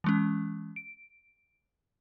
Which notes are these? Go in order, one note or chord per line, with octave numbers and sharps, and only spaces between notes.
E3 G#3 C#4
D7